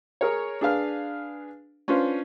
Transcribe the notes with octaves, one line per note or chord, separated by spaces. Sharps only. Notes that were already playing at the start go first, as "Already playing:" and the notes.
G#4 A#4 C#5
D4 G#4 B4 F5 F6
C#4 D4 F4 B4 C5